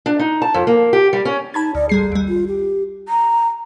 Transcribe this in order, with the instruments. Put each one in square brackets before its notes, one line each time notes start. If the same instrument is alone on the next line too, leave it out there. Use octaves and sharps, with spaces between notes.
[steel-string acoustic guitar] D4
D#4
A5
F2
A#3
G4
G3
C#4
[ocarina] D#4 [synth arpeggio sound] A5 B5 G#6
[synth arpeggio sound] D2 [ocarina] D5
[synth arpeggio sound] A1 G3 C7 [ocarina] G#4
[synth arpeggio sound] D#2 G3
[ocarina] F4
G4
[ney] A#5